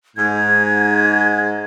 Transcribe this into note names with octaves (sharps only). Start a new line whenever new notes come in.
G#2 G#6